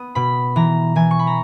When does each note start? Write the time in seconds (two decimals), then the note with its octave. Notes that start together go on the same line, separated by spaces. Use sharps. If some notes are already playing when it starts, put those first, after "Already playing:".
Already playing: B3 D#6
0.15 B2 B5
0.56 E3 A#5
0.96 E3 G#5
1.11 C#6
1.19 B5
1.27 A#5